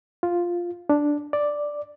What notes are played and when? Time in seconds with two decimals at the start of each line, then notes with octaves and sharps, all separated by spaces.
0.23 F4
0.90 D4
1.33 D5